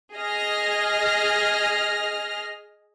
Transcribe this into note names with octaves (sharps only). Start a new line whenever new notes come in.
G#4 D#5 F6 A#6